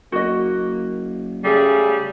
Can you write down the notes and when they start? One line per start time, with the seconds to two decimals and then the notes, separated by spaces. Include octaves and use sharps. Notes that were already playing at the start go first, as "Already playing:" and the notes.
0.12 F#1 A#3 F#4 D#5
1.44 C#3 G3 A3 G#4